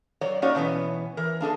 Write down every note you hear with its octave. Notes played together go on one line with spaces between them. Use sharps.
F#3 C#5 D5
A#3 C#4 D#4 F#4 C#5 D5
B2 E3 B3 C#4
E3 A#4
A#3 D4 G#4 A4